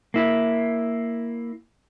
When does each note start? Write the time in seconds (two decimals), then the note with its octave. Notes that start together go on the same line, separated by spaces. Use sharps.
0.14 A#3 E4